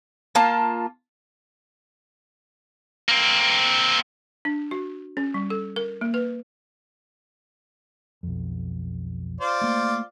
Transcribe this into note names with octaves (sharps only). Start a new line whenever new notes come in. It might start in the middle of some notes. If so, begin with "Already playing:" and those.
A#3 F4 A5
A#3 C4
D4
F#4
C#4
G3
A4
A#4
A#3
B4
B1 F2
F4 C5 D5
A3 A#3